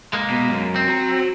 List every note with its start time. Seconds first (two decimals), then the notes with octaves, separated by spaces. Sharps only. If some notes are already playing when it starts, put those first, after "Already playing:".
0.13 G#3 A#3
0.30 B2
0.49 F#2
0.76 C4
0.88 F#4 A#5